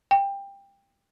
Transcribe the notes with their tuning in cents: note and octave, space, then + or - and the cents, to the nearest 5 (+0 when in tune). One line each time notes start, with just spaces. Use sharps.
G5 +20